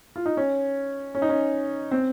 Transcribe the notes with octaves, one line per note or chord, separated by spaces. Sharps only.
F4
D#4
C#4
C#4
D#4
C#4
C4